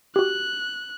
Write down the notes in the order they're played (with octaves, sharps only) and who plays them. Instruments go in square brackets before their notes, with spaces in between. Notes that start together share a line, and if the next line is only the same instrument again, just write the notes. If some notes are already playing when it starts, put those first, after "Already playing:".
[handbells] F#4 G4 [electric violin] F#6